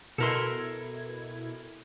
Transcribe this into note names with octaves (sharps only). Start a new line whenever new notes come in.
B2 E4 A4 A#4 C6 G#6